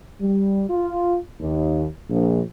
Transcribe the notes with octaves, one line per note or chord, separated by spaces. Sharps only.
G3
F4
D#2
A#1